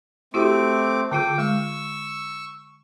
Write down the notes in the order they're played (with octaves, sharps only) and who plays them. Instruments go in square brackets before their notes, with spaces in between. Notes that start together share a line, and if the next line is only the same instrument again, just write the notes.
[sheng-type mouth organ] A3 C4 D6 [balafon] E4 F#4 G4
[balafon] D3 F4 G#4 [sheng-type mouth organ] G5 D6
[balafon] G#3 [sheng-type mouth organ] C#6 E6